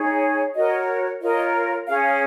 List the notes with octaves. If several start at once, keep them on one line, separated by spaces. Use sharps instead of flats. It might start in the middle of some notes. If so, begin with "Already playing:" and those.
Already playing: D#4 G#4 C#5
F#4 A#4 C#5 D#5
F4 A#4 C#5 D#5
C#4 G#4 C#5 F5
F5